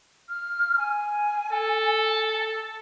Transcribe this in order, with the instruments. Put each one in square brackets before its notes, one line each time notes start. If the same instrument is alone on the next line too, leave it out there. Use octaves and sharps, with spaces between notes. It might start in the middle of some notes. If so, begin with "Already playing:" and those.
[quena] F6
G#5
[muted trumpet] A4